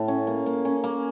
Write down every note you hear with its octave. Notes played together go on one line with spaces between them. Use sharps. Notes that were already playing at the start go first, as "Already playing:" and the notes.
Already playing: A2
C#4
A#3
A#3
C#4
A#3